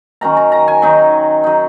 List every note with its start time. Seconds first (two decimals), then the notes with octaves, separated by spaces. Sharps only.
0.21 D#3 F#3 C#4 A#5
0.37 A#5
0.52 A#5
0.68 G#5
0.82 D#3 F#3 D#4
1.44 F#3 D#4